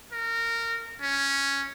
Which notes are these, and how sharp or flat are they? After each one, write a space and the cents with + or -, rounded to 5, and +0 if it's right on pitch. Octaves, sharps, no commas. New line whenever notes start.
A#4 -20
C#4 +0